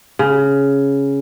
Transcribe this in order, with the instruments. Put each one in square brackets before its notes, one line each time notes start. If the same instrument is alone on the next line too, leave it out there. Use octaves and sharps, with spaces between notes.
[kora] C#3